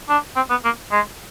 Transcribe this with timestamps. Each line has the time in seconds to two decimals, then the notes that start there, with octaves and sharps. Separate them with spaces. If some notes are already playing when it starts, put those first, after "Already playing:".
0.09 D4
0.36 C4
0.50 B3
0.65 A#3
0.92 G#3